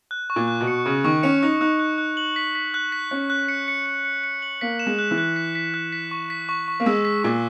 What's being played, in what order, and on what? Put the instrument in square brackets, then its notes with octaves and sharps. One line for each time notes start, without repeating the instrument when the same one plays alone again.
[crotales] F#6
C#6
[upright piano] A#2
[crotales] F#6
[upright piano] B2
[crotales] C#7
[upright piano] C#3 [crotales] C#6
[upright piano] D#3 [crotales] C#6
[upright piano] C#4 [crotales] C#7
[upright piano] D#4 [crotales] F#6
[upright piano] D#4 [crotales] F#6
[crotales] F#6
F#6
F#7
B6
B6
F#6
B6
[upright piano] C#4 [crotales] F#6
[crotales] F#6
C#7
C#7
C#7
C#7
C#7
F#7
[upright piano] A#3 [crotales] B6
[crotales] E7
[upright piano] G#3
[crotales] F#6
[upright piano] E3
[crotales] F#6
B6
B6
F#6
B6
C#6
B6
C#6
C#6
[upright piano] A#3
[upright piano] G#3 [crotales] E6
[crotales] B6
[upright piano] A#2 [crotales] C#6